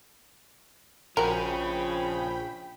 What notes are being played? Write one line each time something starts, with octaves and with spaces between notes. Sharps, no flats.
A#1 F3 C#4 F#4 G#4 A#4 G5 B5